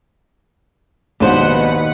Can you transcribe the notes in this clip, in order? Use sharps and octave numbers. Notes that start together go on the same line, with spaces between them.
A#1 D#2 G#2 B2 B4 C5 F#5